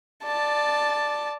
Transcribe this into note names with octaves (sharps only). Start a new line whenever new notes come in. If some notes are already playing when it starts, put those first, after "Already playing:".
D5 A5